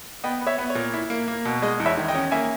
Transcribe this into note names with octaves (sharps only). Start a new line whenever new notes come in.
B3 D#5 G5
B3
C#5 E5
B3
C#5
A#2
E4
A#3
A#3
B2
G#3 D#5
E2
C#5 E5
D#3
D#5 G5
C#4
A#3 E5 G#5